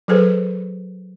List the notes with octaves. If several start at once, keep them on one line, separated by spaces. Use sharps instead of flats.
F#3 G#4 A4 B4 C5